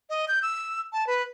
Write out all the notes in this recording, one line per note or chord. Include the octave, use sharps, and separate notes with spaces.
D#5
G6
E6
A5
B4